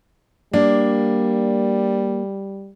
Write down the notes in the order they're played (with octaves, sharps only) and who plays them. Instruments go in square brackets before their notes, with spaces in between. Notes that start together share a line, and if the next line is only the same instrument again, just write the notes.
[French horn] G3 [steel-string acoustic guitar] A#3 [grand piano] D4